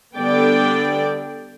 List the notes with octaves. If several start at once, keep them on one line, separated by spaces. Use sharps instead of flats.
D3 G3 B3 D4 D5 G5